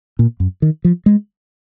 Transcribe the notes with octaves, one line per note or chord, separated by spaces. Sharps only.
A#2
F#2
D#3
F3
G#3